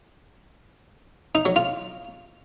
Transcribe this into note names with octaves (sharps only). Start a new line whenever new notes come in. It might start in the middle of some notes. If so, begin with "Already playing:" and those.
D#4
F#3
F4